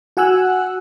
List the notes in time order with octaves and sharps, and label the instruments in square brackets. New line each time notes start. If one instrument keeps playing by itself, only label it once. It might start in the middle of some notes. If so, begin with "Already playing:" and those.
[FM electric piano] F#4 F#5 G#5 E6 F#6